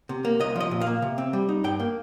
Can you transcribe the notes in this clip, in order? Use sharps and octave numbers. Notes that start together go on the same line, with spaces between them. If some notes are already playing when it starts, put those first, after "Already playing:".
C3
A#3
C2 D#5
F3 D#5
A#2
F5
A#3
C3
C4
G3
D#4
G2 G5
A#3